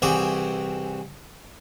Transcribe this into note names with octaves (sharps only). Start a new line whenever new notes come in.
C2 E3 C4 F#4 G#4 D6